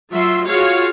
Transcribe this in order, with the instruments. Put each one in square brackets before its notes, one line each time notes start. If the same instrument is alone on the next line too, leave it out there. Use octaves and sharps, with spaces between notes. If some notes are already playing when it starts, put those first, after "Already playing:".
[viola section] F#3 F4 E5 C6
F4 F#4 G#4 C#5 F5